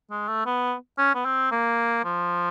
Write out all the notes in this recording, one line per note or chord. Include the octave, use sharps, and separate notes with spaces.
G#3
A3
B3
C#4
B3
C4
A#3
F3